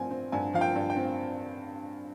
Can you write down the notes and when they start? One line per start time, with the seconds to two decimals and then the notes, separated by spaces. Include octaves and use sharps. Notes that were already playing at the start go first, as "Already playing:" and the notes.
Already playing: G2 F3 C4 G#5
0.11 C4
0.32 G2 G#5
0.54 F3 F5
0.61 G5
0.75 G2
0.90 G5
0.96 C4